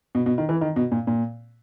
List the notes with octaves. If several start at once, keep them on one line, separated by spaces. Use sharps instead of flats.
B2
B2
D#3
E3
D#3
B2
A#2
A#2